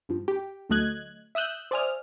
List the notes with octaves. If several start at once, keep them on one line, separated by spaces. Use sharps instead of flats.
G2 F3
G4
D2 F#3 A3 D#5 F#6 G#6
E5 D#6 E6 F#6 G6
C5 D5 E5 G#5 D#6 F6